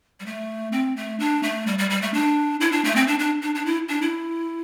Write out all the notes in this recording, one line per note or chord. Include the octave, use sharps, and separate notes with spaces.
G3
A3
C4
A3
D4
A3
G3
G3
G3
A3
D4
E4
D4
A3
C4
D4
D4
D4
D4
E4
D4
E4